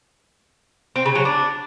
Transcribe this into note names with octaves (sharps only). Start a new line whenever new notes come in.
C4
C#3
F#3
D4